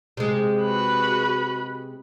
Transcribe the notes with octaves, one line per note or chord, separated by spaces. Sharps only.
C3 G#3
F#4 B4